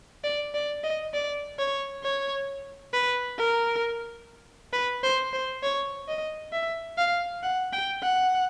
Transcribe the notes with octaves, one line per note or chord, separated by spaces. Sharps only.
D5
D5
D#5
D5
C#5
C#5
B4
A#4
B4
C5
C5
C#5
D#5
E5
F5
F#5
G5
F#5